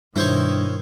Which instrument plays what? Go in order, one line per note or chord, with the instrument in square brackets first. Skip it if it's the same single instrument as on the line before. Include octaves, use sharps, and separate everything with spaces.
[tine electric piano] G2 [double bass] B2 D#3 [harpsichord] E4 C5 C#5